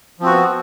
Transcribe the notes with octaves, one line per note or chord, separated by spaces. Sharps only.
F3 B3 C4 F#4